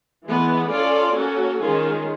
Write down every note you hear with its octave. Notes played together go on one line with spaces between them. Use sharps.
E3 G#3 B3
C#4 F4 A4 D5
A#3 C#4 F#4 A4
D#3 G#3 C#4 F4 G#4